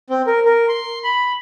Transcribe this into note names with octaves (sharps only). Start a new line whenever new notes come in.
C4
A#4
A#4
C6
B5